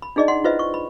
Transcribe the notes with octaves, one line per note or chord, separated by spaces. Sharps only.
B5
D4 D#4 G#4 D5 D#5
F#5 C6
E4 F4 B4 C5 D#5 E5
C#6
B5